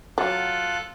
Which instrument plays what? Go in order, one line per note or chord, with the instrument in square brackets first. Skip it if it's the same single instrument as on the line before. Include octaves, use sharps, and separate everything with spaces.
[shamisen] F#3 [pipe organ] F4 A4 F#6